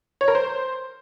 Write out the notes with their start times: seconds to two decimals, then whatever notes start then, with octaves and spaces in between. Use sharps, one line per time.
0.21 C#5
0.28 A#4
0.35 C5